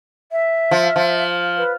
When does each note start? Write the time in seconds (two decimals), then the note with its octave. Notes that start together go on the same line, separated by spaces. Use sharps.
0.32 E5
0.71 F3
0.96 F3
1.57 B4